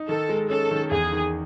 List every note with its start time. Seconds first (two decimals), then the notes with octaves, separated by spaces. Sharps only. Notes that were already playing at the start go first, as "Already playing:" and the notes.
Already playing: D#4
0.09 D#3 A4
0.29 G#3
0.50 C#4 A4
0.71 D#3
0.91 E2 G#4
1.13 D#3